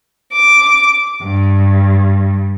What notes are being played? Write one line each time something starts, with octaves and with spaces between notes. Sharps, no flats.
D6
G2